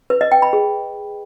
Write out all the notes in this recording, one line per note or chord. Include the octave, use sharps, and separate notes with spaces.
B4
D#5
G5
B5
G#4